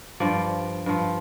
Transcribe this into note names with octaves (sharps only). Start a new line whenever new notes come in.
G2 F3 D5
G2 F3